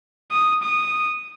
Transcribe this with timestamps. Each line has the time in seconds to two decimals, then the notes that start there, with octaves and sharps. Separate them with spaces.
0.31 D#6
0.63 D#6